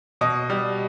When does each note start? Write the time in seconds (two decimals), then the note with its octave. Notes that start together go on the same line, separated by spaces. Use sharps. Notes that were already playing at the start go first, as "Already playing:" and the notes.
0.21 B2 D#5
0.50 G3